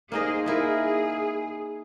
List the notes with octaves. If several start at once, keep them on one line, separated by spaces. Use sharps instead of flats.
A#3 D#4 G#4 C5 D#5
D#4 E4 G#4 A#4